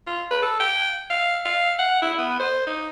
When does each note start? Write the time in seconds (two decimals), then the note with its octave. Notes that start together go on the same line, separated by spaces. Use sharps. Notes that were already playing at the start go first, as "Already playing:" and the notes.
0.07 F4
0.31 B4
0.42 A4
0.60 G5
1.10 F5
1.45 F5
1.79 F#5
2.02 E4
2.18 B3
2.40 C5
2.67 D#4